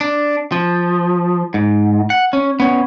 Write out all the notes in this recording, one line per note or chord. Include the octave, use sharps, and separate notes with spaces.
D4
F3
G#2
F#5
C#4
B3 C#4